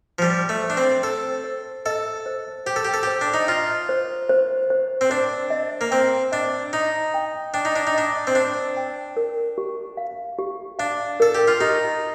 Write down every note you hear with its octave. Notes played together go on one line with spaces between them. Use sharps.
F3
G3 C5
A3
C5
D4
C4
A4 C5
C5
A4 D#5
C5
G4 C5
A4
G4
A4
G4 C5
D4
D#4
F4 D#5
C5
C5
C5
C4
D4 C5
D#5
A#3
C4 G5
D4 D#5
D#4 D#5
G5
D4 G5
D#4
D4
D#4
D4 D#5
C4
D4 C5
G5
A#4
G4
F5
G4
D4 F5
A4 A#4
G4
F4
D#4 G4